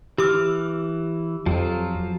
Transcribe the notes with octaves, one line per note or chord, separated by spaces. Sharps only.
E3 G4 D6 E6 F6
F2 F3 F#3 F4